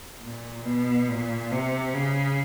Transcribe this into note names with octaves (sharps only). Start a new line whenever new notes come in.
A#2
B2
A#2
C3
C#3